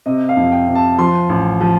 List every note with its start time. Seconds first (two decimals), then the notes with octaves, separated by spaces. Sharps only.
0.06 C3 D#5
0.29 F5
0.37 F2
0.52 G5
0.68 C3
0.75 A5
0.98 F3 C6
1.29 A1
1.61 F3